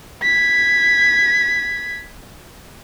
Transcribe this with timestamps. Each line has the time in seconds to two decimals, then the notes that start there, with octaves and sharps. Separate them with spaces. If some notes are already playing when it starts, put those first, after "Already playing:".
0.22 G#6 B6